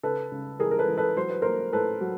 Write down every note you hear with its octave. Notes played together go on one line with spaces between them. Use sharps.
C#3 A4 B4
C#3
E3 G#4 A#4
A#4
A4 B4
E3
A4 B4
F#3 C5
B4
A#3 A#4 C5
A2 A4 B4
F#3